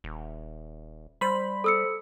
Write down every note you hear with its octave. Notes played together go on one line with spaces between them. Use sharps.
D#1
G3 C5 B5
A4 E6 C#7